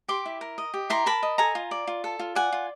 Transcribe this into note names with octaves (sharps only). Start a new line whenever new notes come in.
G4 C6 D6
E4
A#4
D#5
G4
E4 A#5 C6
A#4 A5 B5
D#5
A4 G#5 A#5
F4
D5
F4
A4
F4
D5 F#5 G#5
F4